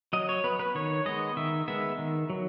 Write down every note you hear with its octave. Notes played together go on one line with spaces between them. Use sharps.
F#3 D#5
C#5
B3 B4
B4
D#3 C#5
G#3 B3 D#5
D#3 E5
G#3 B3 E5
D#3
F#3